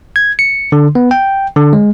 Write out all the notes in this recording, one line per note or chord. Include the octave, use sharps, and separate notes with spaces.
G#6
C#7
D3
B3
G5
D3
G#3